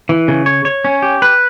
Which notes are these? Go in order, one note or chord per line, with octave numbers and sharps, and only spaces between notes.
E3
C#3
C#5
C#5
C#4
G4
B4